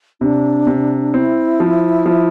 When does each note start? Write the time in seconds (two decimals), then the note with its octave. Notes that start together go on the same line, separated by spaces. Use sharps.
0.21 C3 D4
0.67 C3
1.14 C4 E4
1.60 F3
2.06 F3